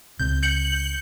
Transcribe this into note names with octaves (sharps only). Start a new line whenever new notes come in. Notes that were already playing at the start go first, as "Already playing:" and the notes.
C#2 C3 G6
G6 C#7 F#7